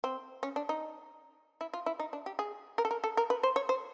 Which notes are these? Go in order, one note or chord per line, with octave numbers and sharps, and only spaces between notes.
C4
C#4
D4
D#4
E4
F4
E4
D#4
D4
G4
G#4
A#4
A4
A#4
A4
A#4
B4
C5
C#5
C5